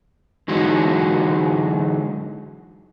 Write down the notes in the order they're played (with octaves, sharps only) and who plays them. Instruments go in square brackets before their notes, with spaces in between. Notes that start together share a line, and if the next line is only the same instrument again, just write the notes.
[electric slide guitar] D3 E3 F#3 G#3 D#4 F#4